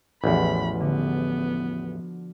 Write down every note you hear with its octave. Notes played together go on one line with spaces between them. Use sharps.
A1 E2 F3 F#4 B5
D3 B3